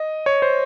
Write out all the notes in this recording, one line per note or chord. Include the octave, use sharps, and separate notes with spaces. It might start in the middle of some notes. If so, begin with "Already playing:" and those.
Already playing: D#5
C#5
C5